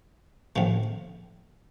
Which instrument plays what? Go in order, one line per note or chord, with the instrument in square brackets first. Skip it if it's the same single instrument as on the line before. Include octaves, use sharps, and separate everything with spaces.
[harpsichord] A1 A2 F3